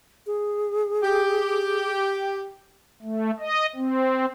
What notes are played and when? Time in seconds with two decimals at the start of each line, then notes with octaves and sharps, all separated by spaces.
0.26 G#4
1.03 G4
3.02 A3
3.39 D#5
3.76 C4